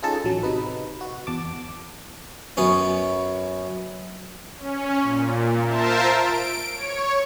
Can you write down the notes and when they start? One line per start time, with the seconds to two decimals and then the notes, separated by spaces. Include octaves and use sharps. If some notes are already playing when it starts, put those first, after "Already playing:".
0.02 C#4 D#4 F4 G#4 A4 A5
0.24 A1 F#3
0.43 C3 D#4 B4
1.01 F#4
1.27 E2 A5 D6
2.57 F#2 B3 C#4
4.57 C#4
5.02 A#2
5.66 F4 A#4 C5 E5 A5
6.15 D7
6.74 C#5